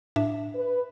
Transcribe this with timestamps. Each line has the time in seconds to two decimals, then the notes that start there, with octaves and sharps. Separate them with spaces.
0.16 A2 D4 E5
0.55 B4